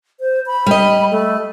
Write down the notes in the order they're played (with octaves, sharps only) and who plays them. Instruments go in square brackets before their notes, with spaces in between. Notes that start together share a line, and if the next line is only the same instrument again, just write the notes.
[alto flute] C5
B5
[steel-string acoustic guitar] G3 D#5
[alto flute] A3